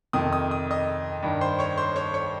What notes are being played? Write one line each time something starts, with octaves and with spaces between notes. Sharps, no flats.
F2 C3 D#3 D#6
D#6
D#6
D#5 D#6
G2 D#3
C5 C6
C#5 C#6
C5 C6
C#5 C#6
C#5 C#6